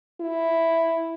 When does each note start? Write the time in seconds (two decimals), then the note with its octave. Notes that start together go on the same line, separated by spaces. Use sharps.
0.21 E4